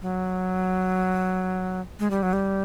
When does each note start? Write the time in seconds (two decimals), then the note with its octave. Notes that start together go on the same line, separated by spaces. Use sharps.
0.02 F#3
2.00 G#3
2.11 G3
2.23 F#3
2.33 G3